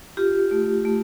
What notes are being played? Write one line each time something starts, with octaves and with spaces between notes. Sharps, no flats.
F4 G4
A3
A3